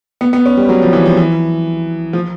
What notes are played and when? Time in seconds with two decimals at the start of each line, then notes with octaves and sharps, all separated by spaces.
0.21 B3
0.33 B3
0.46 C#4
0.57 G3
0.69 F#3
0.82 F3
0.93 E3
1.05 F3
1.17 E3
2.13 F3